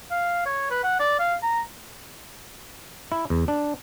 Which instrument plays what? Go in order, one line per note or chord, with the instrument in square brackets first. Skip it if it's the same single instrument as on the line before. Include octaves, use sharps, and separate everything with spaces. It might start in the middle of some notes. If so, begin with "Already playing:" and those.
[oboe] F5
C#5
B4
F#5
D5
F5
A#5
[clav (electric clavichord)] E4
E2
D4